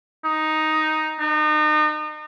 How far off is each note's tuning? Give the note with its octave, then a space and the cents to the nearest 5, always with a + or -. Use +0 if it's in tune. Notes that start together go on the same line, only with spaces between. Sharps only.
D#4 +0
D#4 -35